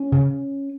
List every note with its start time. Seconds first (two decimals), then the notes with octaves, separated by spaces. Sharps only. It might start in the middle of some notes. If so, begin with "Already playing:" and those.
Already playing: C#4
0.12 C#3